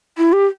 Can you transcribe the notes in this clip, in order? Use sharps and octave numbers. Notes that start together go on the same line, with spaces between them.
E4
G4